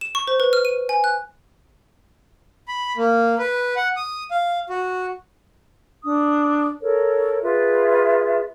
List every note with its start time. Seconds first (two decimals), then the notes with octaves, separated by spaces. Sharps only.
0.01 E7
0.15 C#6
0.28 C5
0.40 B4
0.53 F6
0.65 D#7
0.89 G#5
1.04 F#6
2.68 B5
2.97 A#3
3.39 B4
3.76 F#5
3.96 D#6
4.31 F5
4.69 F#4
6.04 D4 D#6
6.82 A4 A#4 C#5
7.43 F4 G#4 B4 E5